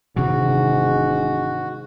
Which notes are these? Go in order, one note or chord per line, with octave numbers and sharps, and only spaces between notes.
E1 G#2 C3 D#3 E3 F#4